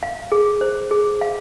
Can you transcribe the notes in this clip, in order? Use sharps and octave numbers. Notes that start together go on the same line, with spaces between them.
F5
G#4
C5
G#4
F5